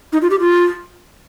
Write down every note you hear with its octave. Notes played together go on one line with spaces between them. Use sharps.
D#4
F4
G4
F4